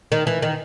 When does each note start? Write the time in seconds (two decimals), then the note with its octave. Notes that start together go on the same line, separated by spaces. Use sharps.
0.12 D#3
0.27 E3
0.42 D#3